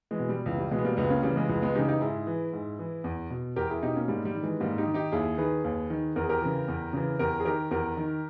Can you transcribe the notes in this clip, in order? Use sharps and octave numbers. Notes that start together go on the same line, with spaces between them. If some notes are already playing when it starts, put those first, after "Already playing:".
E3 G#3
B2
G3
C#2 E3
G3
B2 E3 G#3
B3
G3 A#3
C#2 G#3 B3
A#3 C#4
C#3 E3 G3 A#3
E3 G#3
C#2 E3 G#3
G#3 B3
C#3 E3 D#4 G4
D#4 G4
G#2 E4 G#4
E3
G#2
E3
E2
B2
E2 G4 A#4
E4 G#4
B2 D#4 G4
A#3 C#4
G#2 G3 A#3
G3
D#3
E3 G#3
G#2 G3 A#3
D#4 G4
D#3
D#4 G4
D#2 E4 G#4
D#3 G#4 B4
D#2
D#3
E2 A#4
G#4
G4 A#4
C#3 E3
E2
C#3 E3
E2 G4 A#4
G#4
D#3 G4 A#4
E2 G4 A#4
D#3